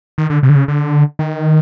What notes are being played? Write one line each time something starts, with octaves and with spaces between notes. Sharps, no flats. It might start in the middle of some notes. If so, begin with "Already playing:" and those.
D#3
D3
C3
D3
C#3
D3
D#3